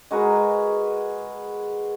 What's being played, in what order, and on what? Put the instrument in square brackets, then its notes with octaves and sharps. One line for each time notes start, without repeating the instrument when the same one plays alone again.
[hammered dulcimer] G#3 F#4 A#4 B4